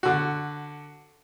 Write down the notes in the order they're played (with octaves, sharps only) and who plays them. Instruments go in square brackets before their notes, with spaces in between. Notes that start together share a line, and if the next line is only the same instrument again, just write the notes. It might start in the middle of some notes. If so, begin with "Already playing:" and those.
[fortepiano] D3 F#4